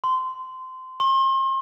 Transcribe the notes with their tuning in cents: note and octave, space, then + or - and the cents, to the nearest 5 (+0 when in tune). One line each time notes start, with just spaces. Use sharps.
C6 -20
C6 +40